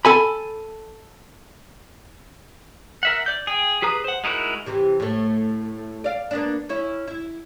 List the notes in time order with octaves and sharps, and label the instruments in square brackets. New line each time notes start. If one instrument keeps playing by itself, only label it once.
[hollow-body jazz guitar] A4 G#5 B5
[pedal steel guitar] A#4 E5 F#5
D5 G6
G#4 G5
G4 G#4 B4 A#5 D#6
C5 F#5
G#3 D#4 E4 F#4 A#4
[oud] C3 E3 G4
A2 A3
D5 F5
A#3 B3 D4
C#4 E4
E4